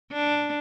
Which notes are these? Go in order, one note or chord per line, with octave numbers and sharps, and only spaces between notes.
D4